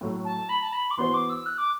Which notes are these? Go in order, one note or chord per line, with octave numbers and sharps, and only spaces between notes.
A2 F#3 A3
A5
B5
A5
B5
D6
E3 B3 F#4 C5 C6
D6
E6
F#6
D6